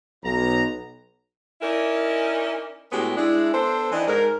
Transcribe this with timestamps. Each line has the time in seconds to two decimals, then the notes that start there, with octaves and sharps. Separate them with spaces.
0.24 B1 A#5
1.62 C#4 D#4 E4 A#4 D5
2.92 A2 G#3 B3 C#4 F#4 G4
3.17 G#3 D4 E4
3.53 B3 D4 A4 C5
3.92 D#3 E3 D4 D#4
4.07 G#2 A#4